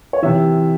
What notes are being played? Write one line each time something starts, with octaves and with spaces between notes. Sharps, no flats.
C#5
C3 E3 E5